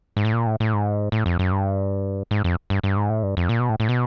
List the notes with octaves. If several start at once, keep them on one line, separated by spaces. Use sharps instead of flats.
G#2
A2
A#2
A2
A2
G#2
A2
F2
F#2
G2
G#2
F2
G2
G2
G#2
A2
G2
F2
A#2
B2
A2
A2
B2